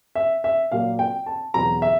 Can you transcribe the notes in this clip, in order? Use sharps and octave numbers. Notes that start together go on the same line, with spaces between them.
E5
E5
A#2 F#3 A#3 F5
G5
A5
E2 B2 F#3 A#5
E5